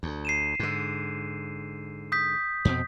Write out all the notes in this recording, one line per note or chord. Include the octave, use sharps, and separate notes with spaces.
D2
C7 D#7 E7
G#2 D3
D#6 G6 B6
F2 B2 C4